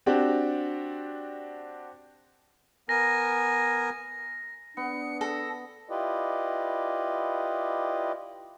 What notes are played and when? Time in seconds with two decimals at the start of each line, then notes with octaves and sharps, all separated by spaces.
0.06 C4 D4 F#4 G4
2.89 B3 A#4 G#5 A#6
4.77 B3 D4 C#7
5.21 A4 A#6
5.90 E4 F4 G4 B4 D5 D#5